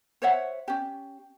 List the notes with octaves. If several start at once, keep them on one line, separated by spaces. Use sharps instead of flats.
C5 C#5 E5 F#5
C#4 G4